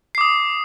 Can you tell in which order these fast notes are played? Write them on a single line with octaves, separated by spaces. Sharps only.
C7 D6 D#6